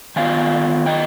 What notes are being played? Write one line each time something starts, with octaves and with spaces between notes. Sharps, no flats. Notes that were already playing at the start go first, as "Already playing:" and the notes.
D#3 B3 F4 F5 G#5
D#5 G5